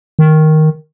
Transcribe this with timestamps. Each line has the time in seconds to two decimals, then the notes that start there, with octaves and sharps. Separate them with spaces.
0.19 D#3